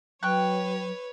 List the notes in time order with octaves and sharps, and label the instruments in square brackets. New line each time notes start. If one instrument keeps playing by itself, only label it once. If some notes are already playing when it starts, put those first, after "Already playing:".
[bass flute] F#3 [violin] B4 C#5 [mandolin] G5 C#6 F#6